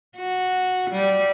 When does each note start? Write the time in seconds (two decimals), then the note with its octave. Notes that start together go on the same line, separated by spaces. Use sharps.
0.16 F#4
0.91 G3